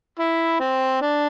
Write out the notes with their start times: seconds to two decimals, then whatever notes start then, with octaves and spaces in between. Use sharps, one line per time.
0.19 E4
0.60 C4
1.02 D4